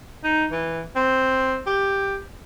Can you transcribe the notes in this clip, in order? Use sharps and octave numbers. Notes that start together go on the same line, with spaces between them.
D#4
E3
C4
G4